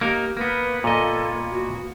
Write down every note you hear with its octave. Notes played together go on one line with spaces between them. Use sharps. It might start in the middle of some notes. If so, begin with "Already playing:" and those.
A#3 D#4 G4 A#4
A#3 B3 B4
A#2 A4 D#5
F#4